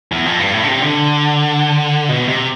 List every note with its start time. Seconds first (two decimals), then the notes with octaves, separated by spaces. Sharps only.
0.12 E2
0.26 F2
0.39 G2
0.53 A2
0.63 D3
0.68 C3
0.82 D3
2.09 B2
2.28 C3